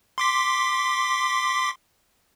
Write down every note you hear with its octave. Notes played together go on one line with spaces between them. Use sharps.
C6 D6 B6